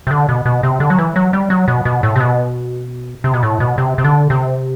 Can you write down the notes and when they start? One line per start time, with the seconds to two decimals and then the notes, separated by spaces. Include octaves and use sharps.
0.07 C3
0.11 D3
0.29 B2
0.46 B2
0.63 C3
0.80 D3
0.90 F#3
0.98 E3
1.16 F#3
1.33 G3
1.50 F#3
1.68 B2
1.85 B2
2.03 A2
2.16 C3
2.20 B2
3.24 C3
3.34 B2
3.43 A2
3.60 B2
3.78 C3
3.98 C3
4.04 D3
4.30 C3